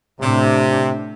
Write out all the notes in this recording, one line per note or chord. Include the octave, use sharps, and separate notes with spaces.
A2 C3 D4